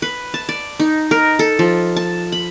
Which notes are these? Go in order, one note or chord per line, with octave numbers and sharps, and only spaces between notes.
B4
A5
D5
D#4
A#4
A4
F3
A5
B5